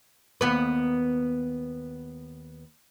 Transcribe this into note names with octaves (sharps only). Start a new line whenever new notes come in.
D#2 B3 B4